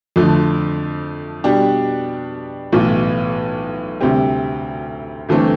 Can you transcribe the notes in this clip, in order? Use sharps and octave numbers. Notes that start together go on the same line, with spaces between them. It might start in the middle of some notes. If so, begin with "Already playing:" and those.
F2 D3 F3 A3
B2 G3 D4 G4
B1 A2 E3 B3 F4
D2 C3 G3 C4 G4
G1 G2 E3 A3 C4